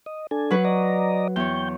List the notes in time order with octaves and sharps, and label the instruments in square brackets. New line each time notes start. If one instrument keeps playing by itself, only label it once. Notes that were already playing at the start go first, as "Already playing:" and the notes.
[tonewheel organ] D#5
D4 A4 G#5
[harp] F#3 B4
[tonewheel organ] D5 D#5 A#5
[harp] E2 C#5 [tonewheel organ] G5 G6